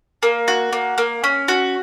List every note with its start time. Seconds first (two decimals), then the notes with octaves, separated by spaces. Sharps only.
0.23 A#3
0.48 F#4
0.73 A#3
0.98 A#3
1.24 C#4
1.48 F#4